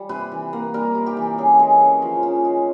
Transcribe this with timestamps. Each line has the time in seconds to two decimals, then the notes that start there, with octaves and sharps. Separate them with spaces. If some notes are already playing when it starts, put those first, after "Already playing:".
Already playing: G3
0.09 C3 B4
0.32 E3
0.53 A#3
0.74 G3 A#4
0.95 C3
1.06 G4
1.17 E3
1.38 C#3 G#4
1.59 G#3
1.81 C#3
2.02 F3
2.23 C#3
2.45 G#3